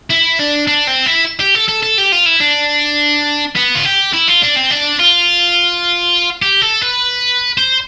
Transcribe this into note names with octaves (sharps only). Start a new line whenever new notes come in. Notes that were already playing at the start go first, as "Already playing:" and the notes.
E4
D4
D4
C4
E4
G4
A4
A4
A4
G4
F4
E4
D4
B3
F4
G4
E4
F4
D4
C4
D4
F4
G4
A4
B4
C5